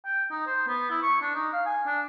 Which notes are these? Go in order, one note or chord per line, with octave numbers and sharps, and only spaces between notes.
G5
D#4
C5
B3
E4
C#6
D4
D#4
F5
G#5
D4